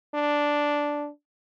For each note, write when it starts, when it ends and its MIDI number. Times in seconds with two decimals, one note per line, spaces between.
0.14 1.09 62